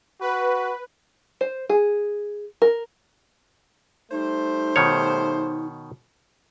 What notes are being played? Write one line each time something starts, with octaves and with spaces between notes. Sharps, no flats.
F#4 B4
C5
G#4
A#4
G3 A3 D#4 C5
B2 D#3 C#5